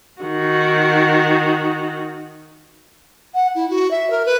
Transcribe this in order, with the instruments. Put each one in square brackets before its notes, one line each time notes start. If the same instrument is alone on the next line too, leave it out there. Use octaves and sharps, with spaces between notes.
[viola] D#3 F#4
[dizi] F#5
E4
F#4
E5
A#4
B4